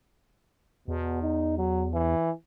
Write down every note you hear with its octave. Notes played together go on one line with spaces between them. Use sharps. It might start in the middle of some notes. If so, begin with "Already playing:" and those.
E2 B2
D#4
F#3
E3